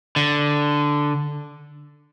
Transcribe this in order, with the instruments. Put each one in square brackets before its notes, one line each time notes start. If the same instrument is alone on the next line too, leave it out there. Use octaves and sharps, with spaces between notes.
[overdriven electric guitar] D3